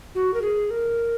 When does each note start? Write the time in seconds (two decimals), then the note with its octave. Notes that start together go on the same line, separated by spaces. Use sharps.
0.15 F#4
0.34 A#4
0.42 G#4
0.71 A#4